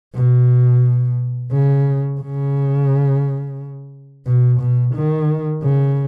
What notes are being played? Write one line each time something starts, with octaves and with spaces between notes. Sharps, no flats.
B2
C#3
C#3
B2
B2
D#3
C#3